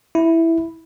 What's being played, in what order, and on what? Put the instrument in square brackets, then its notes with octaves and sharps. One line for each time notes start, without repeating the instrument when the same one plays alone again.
[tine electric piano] E4